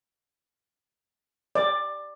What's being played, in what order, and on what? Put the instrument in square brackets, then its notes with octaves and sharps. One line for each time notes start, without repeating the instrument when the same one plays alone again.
[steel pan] D5